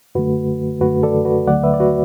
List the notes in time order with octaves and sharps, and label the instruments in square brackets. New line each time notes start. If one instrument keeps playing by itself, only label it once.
[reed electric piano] F#2 D3 A3 F#4 B4
F#2 D3 A3 F#4 B4
A4 D5
F#4 B4
D2 D3 F#3 A3 D5 F#5
B4 E5
D5
F#4 B4